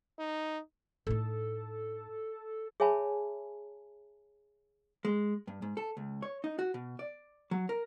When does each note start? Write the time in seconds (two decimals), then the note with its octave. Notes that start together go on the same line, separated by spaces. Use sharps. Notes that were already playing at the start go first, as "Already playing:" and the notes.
0.19 D#4
1.07 A2 D#4 A4
2.80 G#4 C#5 E5 G#5 A5 B5
5.05 G#3
5.47 G2
5.62 G#2
5.77 A4
5.97 C#2
6.22 C#5
6.44 D#4
6.59 F#4
6.74 B2
6.99 D5
7.51 F#3
7.69 A#4